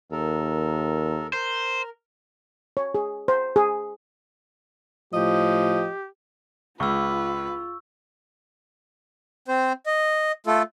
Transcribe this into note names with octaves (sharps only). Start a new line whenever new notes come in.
D#2 A4 A#4
A#4 C5
C#5
G#4
C5
G#4
A2 F3 G4 D#5
C#2 F4 B4 C#6 E6
C4 C5
D#5
A3 F4 A4